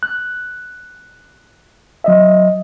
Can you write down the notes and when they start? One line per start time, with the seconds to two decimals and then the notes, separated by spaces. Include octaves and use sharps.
0.03 F#6
2.04 F#3 D#5 E5